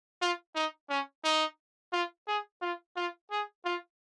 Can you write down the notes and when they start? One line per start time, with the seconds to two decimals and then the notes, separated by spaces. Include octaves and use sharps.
0.21 F4
0.55 D#4
0.89 C#4
1.24 D#4
1.93 F4
2.27 G#4
2.62 F4
2.96 F4
3.31 G#4
3.65 F4